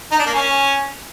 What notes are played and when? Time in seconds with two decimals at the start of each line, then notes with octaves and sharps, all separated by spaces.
0.12 D#4
0.19 D4
0.26 A#3
0.34 C#4